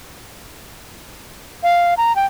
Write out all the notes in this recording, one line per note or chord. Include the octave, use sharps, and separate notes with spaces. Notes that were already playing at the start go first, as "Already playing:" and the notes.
F5
A#5
G5